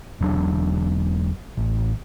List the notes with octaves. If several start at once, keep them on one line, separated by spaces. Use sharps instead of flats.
E1 G2 F#3 D4
A1